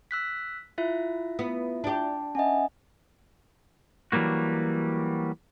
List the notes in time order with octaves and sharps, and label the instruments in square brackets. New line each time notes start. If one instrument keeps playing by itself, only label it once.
[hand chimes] E6 F#6 B6
E4 F4 E5
[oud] B3
D4 G4
[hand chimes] C#4 D#5 [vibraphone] E5 F#5 G#5
[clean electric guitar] E3 F#3 G3 A#3 F#4